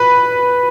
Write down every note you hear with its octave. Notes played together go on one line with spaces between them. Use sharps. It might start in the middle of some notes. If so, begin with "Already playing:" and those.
Already playing: B4